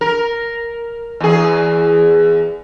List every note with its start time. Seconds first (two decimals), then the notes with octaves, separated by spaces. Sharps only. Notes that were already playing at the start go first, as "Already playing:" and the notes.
0.01 A#4
1.20 E2 G#4